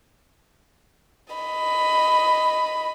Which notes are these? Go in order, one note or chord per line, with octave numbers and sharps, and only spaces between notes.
D#5 B5